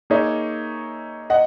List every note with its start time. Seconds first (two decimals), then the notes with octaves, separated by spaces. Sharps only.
0.10 A#3 D#4 G#4 C#5 E5
1.30 D#5 F#5